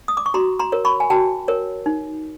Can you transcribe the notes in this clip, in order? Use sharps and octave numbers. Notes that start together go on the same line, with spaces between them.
D#6
D6
C#6
F#4 A#5 C6
A#5 C6
A#4 C#5
B5 C#6
G#5
F#4 G5 A5
A#4 C#5
D#4